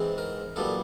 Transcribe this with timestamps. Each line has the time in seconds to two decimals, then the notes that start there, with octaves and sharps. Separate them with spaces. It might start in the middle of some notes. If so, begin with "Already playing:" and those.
Already playing: G#2 E3 G#3 C4
0.18 A#4
0.56 B1 A#2 G3 B3 A4